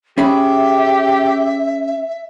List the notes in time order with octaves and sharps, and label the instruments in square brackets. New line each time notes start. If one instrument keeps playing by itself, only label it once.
[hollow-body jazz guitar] C#4 G#4 B5 [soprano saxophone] G4 [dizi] E5